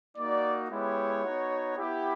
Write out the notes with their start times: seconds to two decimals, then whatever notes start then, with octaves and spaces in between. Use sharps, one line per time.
0.16 A#3 D#4 F#4 D5
0.70 G#3 B3 E4 G4 C#5
1.23 B3 D#4 F#4
1.77 B3 E4 G4